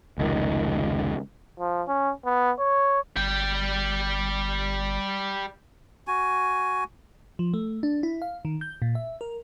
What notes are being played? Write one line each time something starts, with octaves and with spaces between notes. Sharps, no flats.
F1 C#2 D#3
F3
C#4
B3
C#5
G1 G3 G5
F#4 G#5
F3
A3
D4
E4
F5
D#3
G6
A#2
E5
A#4